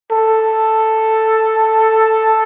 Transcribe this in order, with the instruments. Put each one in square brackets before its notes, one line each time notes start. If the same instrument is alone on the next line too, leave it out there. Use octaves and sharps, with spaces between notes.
[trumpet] A4